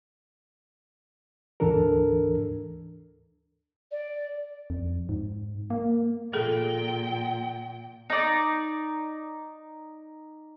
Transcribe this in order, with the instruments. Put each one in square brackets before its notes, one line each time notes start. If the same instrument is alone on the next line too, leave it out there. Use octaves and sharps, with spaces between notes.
[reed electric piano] D2 G#2 E3 D4 A4 A#4
[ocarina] D5
[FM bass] F2
G#2
A#3
[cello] A#2 G5 [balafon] G#4 A4
[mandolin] D#4 D5